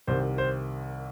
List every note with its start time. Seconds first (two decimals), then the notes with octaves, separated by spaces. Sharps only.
0.07 C2 C3 D#3 C5
0.38 C5